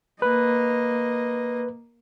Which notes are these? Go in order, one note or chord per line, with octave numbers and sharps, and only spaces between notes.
A#3 B4 D#5